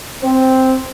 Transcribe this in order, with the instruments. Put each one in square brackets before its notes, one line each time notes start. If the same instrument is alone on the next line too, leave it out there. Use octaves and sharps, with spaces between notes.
[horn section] C4